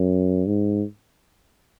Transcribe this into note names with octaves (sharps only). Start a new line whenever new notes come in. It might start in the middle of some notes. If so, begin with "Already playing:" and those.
Already playing: F#2
G#2